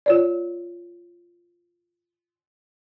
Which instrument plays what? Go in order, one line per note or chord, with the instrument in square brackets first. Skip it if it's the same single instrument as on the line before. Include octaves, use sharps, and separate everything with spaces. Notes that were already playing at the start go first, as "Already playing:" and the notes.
[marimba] F4 C#5 D5